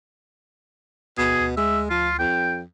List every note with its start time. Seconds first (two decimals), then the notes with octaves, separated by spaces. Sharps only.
1.18 D2 B2 G#4
1.40 D2
1.57 G#3 E5
1.90 F3 F4
2.19 F2 G5